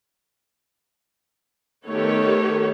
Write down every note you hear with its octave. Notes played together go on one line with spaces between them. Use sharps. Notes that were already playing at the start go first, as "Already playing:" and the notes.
D#3 A3 B3 G4 A4 C#5